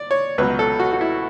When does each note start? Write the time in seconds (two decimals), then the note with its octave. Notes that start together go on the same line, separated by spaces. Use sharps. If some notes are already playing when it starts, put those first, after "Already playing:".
Already playing: D5
0.11 C#5
0.38 C#2 B2 F#3 B4
0.59 A4
0.79 F#4
0.93 F#4
1.01 E4